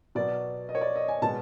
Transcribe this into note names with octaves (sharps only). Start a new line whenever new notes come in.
B2 F#3 B3 D5
D#5
C#5
D5
D#5
G#5
B2 G#3 B3 A5